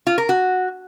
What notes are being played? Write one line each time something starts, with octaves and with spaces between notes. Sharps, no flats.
F4
A#4
F#4